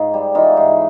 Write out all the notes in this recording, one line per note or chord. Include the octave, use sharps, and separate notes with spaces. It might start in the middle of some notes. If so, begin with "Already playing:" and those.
Already playing: G#2 D#4 F4
G3
E3 D#4 F4
G#2